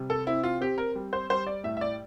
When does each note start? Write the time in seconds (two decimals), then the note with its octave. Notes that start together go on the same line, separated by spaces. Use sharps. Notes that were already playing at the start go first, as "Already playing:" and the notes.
Already playing: C3 G3
0.10 A4
0.27 C4 E4
0.43 F4
0.61 C4 G4
0.78 A#4
0.95 G3
1.13 C5
1.30 G3 C5
1.47 D5
1.64 A2 E5
1.77 E5
1.81 D5